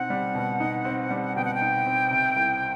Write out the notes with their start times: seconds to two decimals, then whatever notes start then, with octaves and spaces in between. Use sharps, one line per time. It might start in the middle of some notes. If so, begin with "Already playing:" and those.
Already playing: B2 C4 D#4 F#5
0.10 G3
0.35 B2
0.60 D#4
0.85 C4
1.11 G3
1.36 B2 G5
1.45 F#5
1.54 G5
1.61 D#4
1.86 C4
2.11 C3
2.36 C2